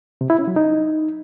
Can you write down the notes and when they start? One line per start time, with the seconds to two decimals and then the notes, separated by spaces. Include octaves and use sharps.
0.21 C3
0.30 E4
0.39 C#4
0.47 F#3
0.56 D#4